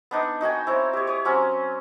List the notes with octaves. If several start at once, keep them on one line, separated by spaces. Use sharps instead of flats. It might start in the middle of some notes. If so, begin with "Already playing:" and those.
B3 D4 D#4
D#4 F#4 G5 G#5
C4 E4 C#5
G4 C#5
C#5 D#6
F#3 C4 C#4 C6